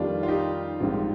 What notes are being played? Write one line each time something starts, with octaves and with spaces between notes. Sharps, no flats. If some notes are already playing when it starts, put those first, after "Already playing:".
Already playing: F2 D#3 G3 D4 F4
F4
D#4 G4
A#1 G#2 G3 C4